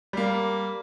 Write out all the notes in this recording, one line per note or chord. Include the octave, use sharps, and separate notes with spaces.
G3 A#3